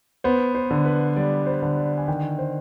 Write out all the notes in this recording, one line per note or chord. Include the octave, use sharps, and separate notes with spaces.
B3 C5
C5
D3
B4
G3 D5
C5
D3
D5
G#5
D#3 G5
C5